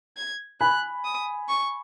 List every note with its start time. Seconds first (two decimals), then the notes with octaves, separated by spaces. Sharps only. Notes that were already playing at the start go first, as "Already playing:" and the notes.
0.17 G#6
0.61 G#5 B5 F#6
1.05 D#6
1.49 C#6